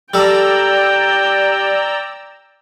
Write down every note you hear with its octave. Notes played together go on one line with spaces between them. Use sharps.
G3 A4 D5 G5 A#5 E6